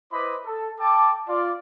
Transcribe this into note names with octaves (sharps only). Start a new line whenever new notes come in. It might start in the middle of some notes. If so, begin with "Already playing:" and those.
E4 B4 C5 D#5 B5 D6
A4
A4 G5 A5 D6
F4 D5